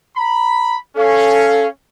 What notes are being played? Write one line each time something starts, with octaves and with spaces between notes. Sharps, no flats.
A#5 B5
C#4 A4 F5